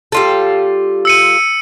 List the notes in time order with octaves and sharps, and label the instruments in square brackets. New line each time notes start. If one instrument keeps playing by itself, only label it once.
[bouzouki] G3 F4 A4
[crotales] E6 C#7 D#7